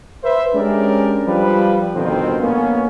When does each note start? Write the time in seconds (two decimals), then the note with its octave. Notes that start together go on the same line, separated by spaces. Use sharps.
0.24 B4 C5 E5
0.55 G#3 C#4 D4 G4 A#4 D5
1.27 F3 G3 B4
1.95 G1 F2 B2 D#3 C4
2.43 A#3 B3 C#4